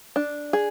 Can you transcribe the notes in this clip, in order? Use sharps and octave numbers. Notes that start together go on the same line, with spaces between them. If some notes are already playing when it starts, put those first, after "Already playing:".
D4
G#4